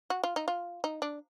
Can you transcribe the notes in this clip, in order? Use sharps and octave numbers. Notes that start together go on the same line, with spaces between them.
F#4
F4
D#4
F4
D#4
D4